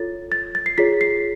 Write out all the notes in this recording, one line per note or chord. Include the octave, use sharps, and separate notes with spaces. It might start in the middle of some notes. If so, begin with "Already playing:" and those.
Already playing: F4 A4 C#5 A6
A6
A6
C7
F4 G#4 C#5 B6
C7